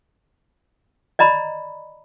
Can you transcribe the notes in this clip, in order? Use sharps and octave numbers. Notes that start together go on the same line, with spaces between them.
D5 D#5 A#5 B5